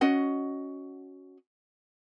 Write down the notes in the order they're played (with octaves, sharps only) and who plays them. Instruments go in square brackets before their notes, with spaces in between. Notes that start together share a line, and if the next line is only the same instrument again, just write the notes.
[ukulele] C#4 F#4 D#5 F#5